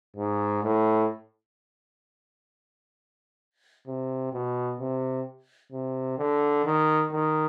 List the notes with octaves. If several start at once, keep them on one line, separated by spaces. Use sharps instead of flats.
G#2
A2
C3
B2
C3
C3
D3
D#3
D#3